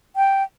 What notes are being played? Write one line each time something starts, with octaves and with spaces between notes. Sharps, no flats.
G5